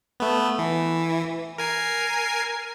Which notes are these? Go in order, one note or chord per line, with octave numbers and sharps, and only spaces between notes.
A3 B3
E3
A#4 G#5 C7